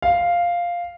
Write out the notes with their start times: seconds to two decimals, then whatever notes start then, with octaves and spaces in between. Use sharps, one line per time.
0.02 F5